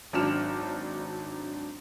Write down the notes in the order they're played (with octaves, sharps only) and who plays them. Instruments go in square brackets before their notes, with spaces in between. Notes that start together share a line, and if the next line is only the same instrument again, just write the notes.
[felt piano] G#1 F#3 D4 F6 E7